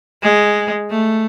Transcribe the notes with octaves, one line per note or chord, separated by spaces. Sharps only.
G#3
A3